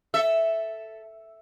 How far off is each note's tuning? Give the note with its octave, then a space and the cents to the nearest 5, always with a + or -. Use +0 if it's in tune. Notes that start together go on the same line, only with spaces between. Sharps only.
A4 +0 E5 +0